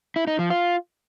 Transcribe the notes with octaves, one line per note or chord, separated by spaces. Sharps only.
E4
D#4
F3
F4